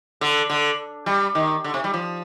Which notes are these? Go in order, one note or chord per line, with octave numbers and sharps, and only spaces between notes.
D3
D3
G3
D#3
D3
C3
G3
F3